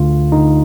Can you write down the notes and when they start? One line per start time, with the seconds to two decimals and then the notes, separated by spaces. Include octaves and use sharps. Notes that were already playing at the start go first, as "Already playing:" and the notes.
Already playing: D2 D3 F4
0.32 D2 D3 D#4